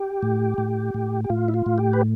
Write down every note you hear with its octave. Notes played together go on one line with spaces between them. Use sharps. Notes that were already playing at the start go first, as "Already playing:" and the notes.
Already playing: G4
A2
A2
A2
G4
A2 F4
E4
F4
A2
G4
B4